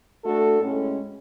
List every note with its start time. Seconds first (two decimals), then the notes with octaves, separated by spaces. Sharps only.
0.24 A3 D4 F#4 A4
0.61 A2 G#3 C#4